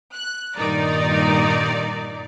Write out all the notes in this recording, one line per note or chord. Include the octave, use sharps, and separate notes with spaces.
F#6
G2 A#2 D#3 D#4 A#4 D5